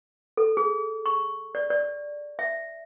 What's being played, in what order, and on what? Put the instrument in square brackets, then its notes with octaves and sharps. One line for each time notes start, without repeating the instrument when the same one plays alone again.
[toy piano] A4
G#4
C#6
D5
D5
E5